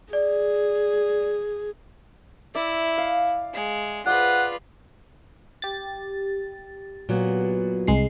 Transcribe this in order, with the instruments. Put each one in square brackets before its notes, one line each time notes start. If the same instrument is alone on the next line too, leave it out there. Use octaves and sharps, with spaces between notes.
[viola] G#4 [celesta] D5
[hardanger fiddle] E4 [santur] D5 E5
[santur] F5
[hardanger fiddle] G#3
[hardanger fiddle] F4 B4 [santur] G#4 C5 D5 [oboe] F#5
[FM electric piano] G4 A6
[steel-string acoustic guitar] A#2 F#3 B3
[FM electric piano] C2 G#3 C7